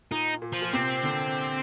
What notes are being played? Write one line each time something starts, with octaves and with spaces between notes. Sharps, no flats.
A#2 D#4
A#2
F3
A#2
C3 C4
D3